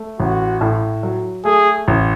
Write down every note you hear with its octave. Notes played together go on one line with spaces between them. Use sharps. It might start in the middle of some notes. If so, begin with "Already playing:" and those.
Already playing: A3
A1 F#4
A2
F#3
A3 G#4
A1